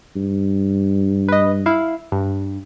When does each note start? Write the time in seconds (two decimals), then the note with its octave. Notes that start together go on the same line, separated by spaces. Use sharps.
0.16 G2
1.28 B4 D#5
1.66 E4 F5
2.12 G2